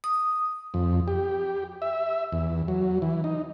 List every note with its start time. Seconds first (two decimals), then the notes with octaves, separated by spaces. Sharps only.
0.04 D#6
0.74 F2
1.08 G4
1.82 E5
2.32 E2
2.68 F#3
3.02 E3
3.24 D#4